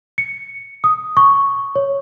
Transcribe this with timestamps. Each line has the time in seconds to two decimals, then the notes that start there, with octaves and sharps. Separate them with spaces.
0.18 C#7
0.84 D#6
1.17 C#6
1.75 C#5